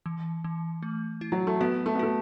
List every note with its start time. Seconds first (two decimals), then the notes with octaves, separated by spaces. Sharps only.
0.06 E3
0.44 E3
0.83 A3
1.21 E4
1.32 F#3
1.47 A3
1.60 B3 F#4
1.86 A3
1.95 B3
1.99 A3 F#4